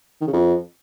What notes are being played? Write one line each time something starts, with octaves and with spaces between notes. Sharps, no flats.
D#3
C#3
F2